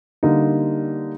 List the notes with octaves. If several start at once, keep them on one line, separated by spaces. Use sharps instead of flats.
D3 G3 A#3 D#4